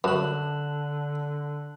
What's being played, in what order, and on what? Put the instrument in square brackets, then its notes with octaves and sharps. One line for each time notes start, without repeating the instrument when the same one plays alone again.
[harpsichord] F#2 [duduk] D3 [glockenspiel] A5 F#6 F#7